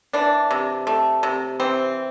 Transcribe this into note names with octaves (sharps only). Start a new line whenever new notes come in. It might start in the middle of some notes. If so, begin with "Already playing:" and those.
E3 D4
C3
A3
C3
E3 C4